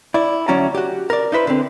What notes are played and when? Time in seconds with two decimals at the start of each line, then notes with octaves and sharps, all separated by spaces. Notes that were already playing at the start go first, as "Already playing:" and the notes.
0.14 E4 D5
0.48 D2 F#3 C#4 F#4 D5 A#5
0.75 F#4 G4
1.10 A#4 D5
1.32 D#4 E4 B4 C5
1.47 D3 C4